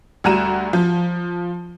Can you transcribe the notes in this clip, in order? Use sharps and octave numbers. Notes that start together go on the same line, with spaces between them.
D2 G3 F#4 A#5 D#7 E7
F3